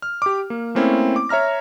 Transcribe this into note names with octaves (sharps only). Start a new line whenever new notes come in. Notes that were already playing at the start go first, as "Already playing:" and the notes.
F6
G4 D6
A#3
A3 A#3 C4 C#4 E4
D6
C#5 E5 A#5 F6 A#6